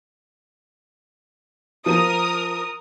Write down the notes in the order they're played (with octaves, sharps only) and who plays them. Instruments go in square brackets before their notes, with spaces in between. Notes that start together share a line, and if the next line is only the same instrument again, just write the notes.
[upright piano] F3 D#7 [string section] A#4 D#6